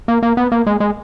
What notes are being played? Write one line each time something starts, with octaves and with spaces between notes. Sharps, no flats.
A#3
A#3
B3
A#3
G#3
G#3